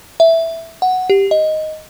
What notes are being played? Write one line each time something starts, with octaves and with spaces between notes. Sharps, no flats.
E5
F#5
G4
D#5